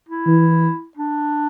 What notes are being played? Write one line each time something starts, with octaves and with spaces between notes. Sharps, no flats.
E4
E3
D4